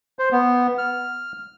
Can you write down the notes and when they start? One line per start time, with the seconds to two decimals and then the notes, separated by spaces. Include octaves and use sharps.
0.19 C5
0.32 B3
0.78 F6